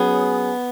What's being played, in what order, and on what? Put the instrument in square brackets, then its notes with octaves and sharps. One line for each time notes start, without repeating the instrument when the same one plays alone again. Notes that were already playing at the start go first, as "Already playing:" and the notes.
Already playing: [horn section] F#3 C#4 G#4 [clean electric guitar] B3